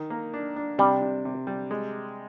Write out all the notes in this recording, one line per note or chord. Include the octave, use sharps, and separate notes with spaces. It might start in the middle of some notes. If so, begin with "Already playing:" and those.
Already playing: D#3
A#3
D4
D4
C3 G3
C3
C3
G3
G#3